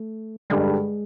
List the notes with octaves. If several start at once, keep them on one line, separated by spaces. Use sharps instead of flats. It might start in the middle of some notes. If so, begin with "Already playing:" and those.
Already playing: A3
G2 D3 G3 G#3